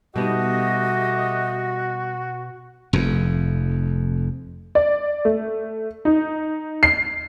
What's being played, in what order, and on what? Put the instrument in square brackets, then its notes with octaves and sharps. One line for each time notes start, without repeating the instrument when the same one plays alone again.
[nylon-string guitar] B2 [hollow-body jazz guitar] G3 B3 D#4 [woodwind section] A3 G4 D#5 [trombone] F#4
[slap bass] F1 F2
[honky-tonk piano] D5
A3
D#4
C7